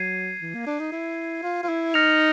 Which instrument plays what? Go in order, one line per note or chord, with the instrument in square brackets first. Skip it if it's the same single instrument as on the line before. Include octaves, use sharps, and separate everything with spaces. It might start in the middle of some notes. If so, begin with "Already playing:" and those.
Already playing: [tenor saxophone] F#3 [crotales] G#6 C7 D#7
[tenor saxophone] E3
A#3
D4
D#4
E4
F4
F4
E4
[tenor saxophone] D#4 [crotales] F6 A#6 C#7 F7